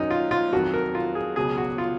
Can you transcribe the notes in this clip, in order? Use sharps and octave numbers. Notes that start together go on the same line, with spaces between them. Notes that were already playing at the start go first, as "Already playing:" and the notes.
Already playing: F#2 D#3 F#3 C#4 D#4
F4
F4
F2 D#3 F#3 F#4
A#4
F4
G#4
C#2 B2 F#3 G#4
F#4
F4